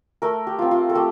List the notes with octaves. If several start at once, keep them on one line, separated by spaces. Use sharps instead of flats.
A3 A#4
G4
C4 F4
F4
A4
A3 G4